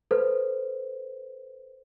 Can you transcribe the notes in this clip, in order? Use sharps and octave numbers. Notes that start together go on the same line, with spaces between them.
A4 B4 C5